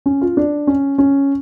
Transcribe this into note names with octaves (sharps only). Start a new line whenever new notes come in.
C#4
F4
D4
C#4
C#4